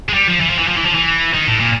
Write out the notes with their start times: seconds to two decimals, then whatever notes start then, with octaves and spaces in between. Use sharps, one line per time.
0.09 G#3
0.14 G3
0.28 F3
0.40 E3
0.50 F3
0.59 E3
0.68 F3
0.77 E3
0.86 F3
0.94 E3
1.34 D#3
1.47 A2
1.60 A#2